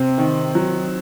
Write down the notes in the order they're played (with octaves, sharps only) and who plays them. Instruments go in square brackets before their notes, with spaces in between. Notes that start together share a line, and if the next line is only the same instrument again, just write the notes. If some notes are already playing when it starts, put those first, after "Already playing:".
Already playing: [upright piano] C3 [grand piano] C4
[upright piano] D#3
F#3